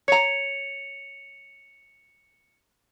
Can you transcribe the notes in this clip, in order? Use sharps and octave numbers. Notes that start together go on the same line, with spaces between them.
C#5 A#5 C#7 F7